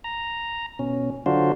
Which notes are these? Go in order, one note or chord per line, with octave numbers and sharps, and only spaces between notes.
A#5
B2 C#4
D3 F#3 D4 F4 F#4 C5